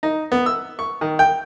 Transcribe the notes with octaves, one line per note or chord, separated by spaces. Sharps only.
D#4
B3
E6
C#6
D#3
G5